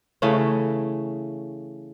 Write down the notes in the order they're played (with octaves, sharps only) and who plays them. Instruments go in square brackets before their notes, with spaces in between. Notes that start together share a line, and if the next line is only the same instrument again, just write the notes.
[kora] C#3 E3 A3 C#4